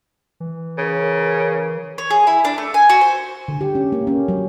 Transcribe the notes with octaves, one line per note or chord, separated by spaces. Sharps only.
E3
C#3 A#4
C#5
G#4
E4
D4
A3
G#5
F#4
C5
D3
G4
C#4
A#3
C#4
F#3